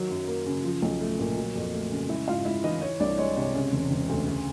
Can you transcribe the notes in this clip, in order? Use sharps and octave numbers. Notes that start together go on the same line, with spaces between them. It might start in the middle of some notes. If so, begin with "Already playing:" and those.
Already playing: D#3 F#3
F#2
A#3
C#3
F3
B1
A3
A#2
F#3
F2
A3
C#3
G#3 E4 E5
G#2 F4 F5
G#2 E4 E5
E3 D#4 D#5
E3 C#5
C2 D4 D5
G#3 C#5
C3 C#5
C#3
E1
E1
D2
C#3